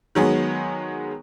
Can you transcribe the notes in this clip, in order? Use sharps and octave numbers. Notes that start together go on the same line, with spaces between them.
D#3 F#3 G#3 B3